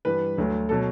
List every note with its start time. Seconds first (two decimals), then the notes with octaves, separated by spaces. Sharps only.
0.05 G2 E3 G3 B4
0.37 D2 D3 F#3
0.69 A4
0.71 B2 F#3